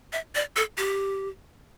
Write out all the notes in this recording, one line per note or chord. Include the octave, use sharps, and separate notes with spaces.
E5
D5
A4
G4